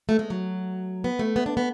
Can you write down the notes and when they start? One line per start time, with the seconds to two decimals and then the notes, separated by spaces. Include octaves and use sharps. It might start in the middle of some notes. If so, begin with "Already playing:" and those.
0.09 A3
0.19 G#3
0.30 F#3
1.04 B3
1.19 A3
1.36 B3
1.46 D4
1.57 B3